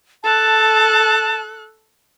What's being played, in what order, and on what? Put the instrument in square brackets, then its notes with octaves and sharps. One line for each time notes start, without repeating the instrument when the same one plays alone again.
[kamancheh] A4 F#6 [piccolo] A5